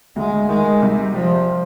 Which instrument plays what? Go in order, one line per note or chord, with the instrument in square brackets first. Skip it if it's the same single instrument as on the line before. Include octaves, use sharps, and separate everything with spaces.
[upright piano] D2 [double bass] G#3
[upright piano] D#3 [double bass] G#3
[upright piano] C3 [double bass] G3
[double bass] F3 [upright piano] G3